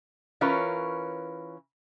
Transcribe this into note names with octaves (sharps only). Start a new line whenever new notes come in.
E3 C#4 F4 A#4 B4 C#5